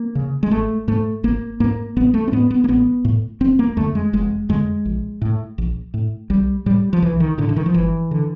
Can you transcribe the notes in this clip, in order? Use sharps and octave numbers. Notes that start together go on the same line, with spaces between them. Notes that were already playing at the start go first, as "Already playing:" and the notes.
Already playing: A#3
C#3
G#3
G#1 A3
G#2 A3
G#1 A#3
G#2 A#3
A1 B3
A3
C4
A2 B3
B3
A#3
A1 B3
A2
F1 C4
A#3
F2 D3 A3
G#3
F1 G#3
F2 D3 G#3
A#1
A2
A#1
A2
B1 G3
A2 G3
F3
B1 E3
D#3
A2 D3
D3
D#3
F3
G1 E3
D3